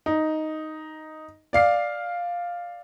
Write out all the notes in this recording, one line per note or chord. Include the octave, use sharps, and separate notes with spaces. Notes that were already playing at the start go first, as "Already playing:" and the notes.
D#4
D5 F5 C7